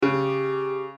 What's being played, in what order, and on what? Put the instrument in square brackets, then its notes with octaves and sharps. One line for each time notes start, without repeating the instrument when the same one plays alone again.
[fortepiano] C#3 [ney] G4